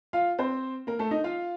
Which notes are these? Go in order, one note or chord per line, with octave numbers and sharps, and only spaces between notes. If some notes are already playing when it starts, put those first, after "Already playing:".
F4 F5
C4 C5
A#3 A#4
A3 A4
D#4 D#5
F4 F5